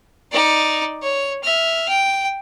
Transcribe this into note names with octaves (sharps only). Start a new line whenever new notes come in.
D#4 D5
C#5
E5 F6
G5